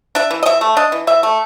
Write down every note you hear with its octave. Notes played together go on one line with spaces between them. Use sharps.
D4 E5
E3
D#5
E3 E5
A3
D4 D#5
E3
E3 E5
A3